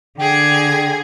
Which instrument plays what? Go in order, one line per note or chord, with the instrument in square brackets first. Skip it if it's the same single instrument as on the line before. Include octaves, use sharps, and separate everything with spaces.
[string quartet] D3 G#4 G#6 [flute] G5